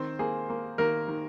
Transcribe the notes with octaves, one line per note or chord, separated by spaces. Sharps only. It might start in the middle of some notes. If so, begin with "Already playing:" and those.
Already playing: D#3 C4 C5
A#3 G#4
A#3
D#3 A#3 A#4
D#3